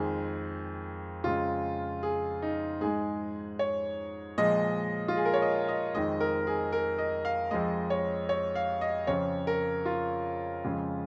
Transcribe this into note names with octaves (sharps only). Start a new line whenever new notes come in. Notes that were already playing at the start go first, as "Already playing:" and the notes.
Already playing: F2 D#3 G#3 G#4
F2 C#3 G#3 F4
G#4
D#4
G#2 G#3 G#4
C#5
A#2 F3 G#3 D#5
F4
G#4
A#4
C#5
D#5
D#5
F2 D#3 G#3 D#5
A#4
G#4
A#4
D#5
F5
F2 F3 G#3 D#5
C#5
C#5
F5
D#5
F2 C#3 F3 C#5
A#4
F4
F2 C#3 F3 G#3